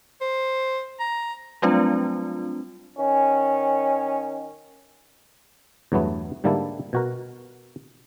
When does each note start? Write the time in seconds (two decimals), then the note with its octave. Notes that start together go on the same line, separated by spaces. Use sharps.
0.21 C5
0.99 A#5
1.62 F#3 G3 A3 C4 D4 F4
2.98 D#3 C#4
5.92 E2 G2 F#3 A3 B3
6.44 G#2 D3 G3 A#3 E4 A5
6.93 B2 F#4 A#4